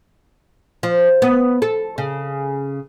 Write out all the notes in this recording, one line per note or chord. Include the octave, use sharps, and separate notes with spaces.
F3
B3
A4
C#3